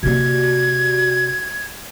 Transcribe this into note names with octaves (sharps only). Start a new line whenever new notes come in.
C3 A#3 F#4 G4 D5 G#6